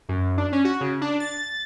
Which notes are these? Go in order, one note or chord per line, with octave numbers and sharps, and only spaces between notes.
F#2
D4
C#4
F#4
C#3
D4
A6